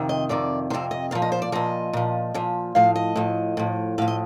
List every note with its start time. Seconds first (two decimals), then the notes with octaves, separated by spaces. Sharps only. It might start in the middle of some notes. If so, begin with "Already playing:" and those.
Already playing: F2 C3 D#3
0.09 D#5
0.29 F2 C3 D#3 D5
0.70 D#3 C5
0.73 F2 C3
0.91 D#5
1.11 A#2 F3 F5
1.22 D#5
1.32 C5
1.42 D5
1.52 A#2 F3 D#5
1.93 A#2 F3
2.34 A#2 F3
2.75 A2 F3 F5
2.96 D#5
3.16 A2 F3
3.57 A2 F3
3.98 A2 F3 F5
4.08 D#5